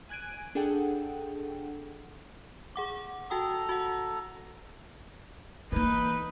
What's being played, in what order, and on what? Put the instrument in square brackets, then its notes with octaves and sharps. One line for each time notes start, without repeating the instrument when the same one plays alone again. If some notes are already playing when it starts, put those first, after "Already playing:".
[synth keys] G#5 F#6 G#6 D7 D#7
D4 G#4 A4 F#5 G5
[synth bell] G#4 F#5 D6
[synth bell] F#4 G5 D#6 [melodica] A4 A#5
[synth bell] F#4 F#5
[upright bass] E3 A#3 [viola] D#4 B4